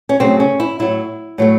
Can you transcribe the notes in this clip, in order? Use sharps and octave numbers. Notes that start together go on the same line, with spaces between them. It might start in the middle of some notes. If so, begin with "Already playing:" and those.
C#4
C#3 F#3 A3 C4
C#4
E4
A2 F#3 A3 E4
A2 F#3 A3